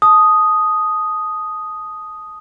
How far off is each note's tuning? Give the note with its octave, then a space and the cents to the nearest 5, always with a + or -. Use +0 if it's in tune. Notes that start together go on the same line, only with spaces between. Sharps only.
A5 -15 D#6 +0